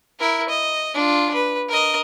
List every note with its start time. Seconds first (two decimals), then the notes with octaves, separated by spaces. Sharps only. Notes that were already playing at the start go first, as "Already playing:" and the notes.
0.20 E4 A#4
0.49 D#5
0.94 D4 F4
1.34 B4
1.69 A#4 D#5